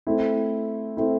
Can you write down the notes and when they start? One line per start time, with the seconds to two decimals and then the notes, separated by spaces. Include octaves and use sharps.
0.07 A3 C4 E4
0.97 A3 C4 E4